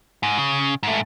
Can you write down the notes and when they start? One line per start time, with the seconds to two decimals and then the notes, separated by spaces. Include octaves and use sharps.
0.23 G#2
0.38 C#3
0.83 G#2 A3